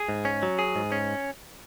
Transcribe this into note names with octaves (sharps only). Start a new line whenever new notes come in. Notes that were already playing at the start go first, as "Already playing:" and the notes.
Already playing: G#4
G#2
C#4
F#3
G#4
G#2
C#4